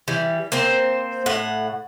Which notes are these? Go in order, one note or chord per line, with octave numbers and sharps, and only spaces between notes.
E3 G3
A#3 C4 C5
A2 F#5